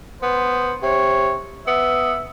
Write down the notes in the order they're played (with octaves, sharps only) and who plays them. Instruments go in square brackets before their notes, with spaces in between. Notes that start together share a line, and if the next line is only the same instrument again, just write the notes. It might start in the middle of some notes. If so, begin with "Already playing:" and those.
[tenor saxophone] B3 [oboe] C5
[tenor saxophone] C3 [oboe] C#5
[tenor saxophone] B3 [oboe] E5